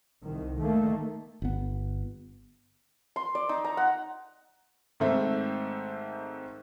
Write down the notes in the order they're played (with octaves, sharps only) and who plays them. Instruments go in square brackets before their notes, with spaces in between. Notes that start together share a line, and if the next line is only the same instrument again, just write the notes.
[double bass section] C2 D#3
D#3 A3 A#3
[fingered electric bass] G1 B3
[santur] C6
D5
D#4
A#5
F#5
[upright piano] G#2 D#3 A3 C4 A4 E5